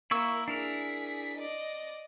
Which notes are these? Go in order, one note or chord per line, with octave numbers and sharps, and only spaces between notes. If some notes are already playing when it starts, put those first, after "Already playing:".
A#3 E4 C#6 E6
D4 E4 G#4 A#4 B6
D5 D#5